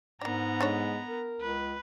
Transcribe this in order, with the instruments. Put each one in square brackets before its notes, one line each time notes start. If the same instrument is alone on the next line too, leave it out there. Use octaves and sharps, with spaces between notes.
[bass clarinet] G#2 [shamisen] D#3 D4 [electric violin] B3 A#5
[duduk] G#3 [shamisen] D4 A4 C#5
[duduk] A#4
[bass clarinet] C#2 [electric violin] B4